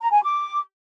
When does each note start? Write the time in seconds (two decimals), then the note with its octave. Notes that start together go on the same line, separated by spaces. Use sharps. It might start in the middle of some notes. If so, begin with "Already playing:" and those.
0.01 A#5
0.12 G#5
0.23 D6